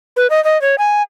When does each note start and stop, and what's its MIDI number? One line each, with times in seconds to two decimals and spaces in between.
0.16 0.27 71
0.30 0.43 75
0.44 0.60 75
0.61 0.75 73
0.78 1.02 80